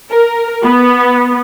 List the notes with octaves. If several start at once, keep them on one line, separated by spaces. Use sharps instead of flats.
A#4
B3